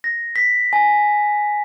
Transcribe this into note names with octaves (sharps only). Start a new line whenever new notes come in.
A#6
B6
G#5